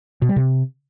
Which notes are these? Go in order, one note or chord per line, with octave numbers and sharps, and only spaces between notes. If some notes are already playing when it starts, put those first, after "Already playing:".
B2
G3
C3